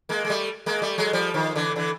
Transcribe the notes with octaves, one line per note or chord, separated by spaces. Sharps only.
G#3 A#3
G#3
G3 A3
G#3 A#3
G3 A3
F#3 G#3
F3 G3
D#3 F3
D3 E3
D3 E3